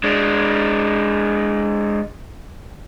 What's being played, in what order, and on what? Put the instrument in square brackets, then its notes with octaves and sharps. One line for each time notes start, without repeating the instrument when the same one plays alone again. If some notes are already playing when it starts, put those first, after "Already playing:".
[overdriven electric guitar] G#3 D4